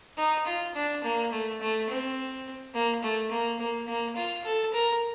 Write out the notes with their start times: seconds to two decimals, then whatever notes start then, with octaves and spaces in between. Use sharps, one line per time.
0.17 D#4
0.46 F4
0.75 D4
1.04 A#3
1.32 A3
1.61 A3
1.89 C4
2.73 A#3
3.03 A3
3.31 A#3
3.59 A#3
3.88 A#3
4.16 F4
4.44 A4
4.73 A#4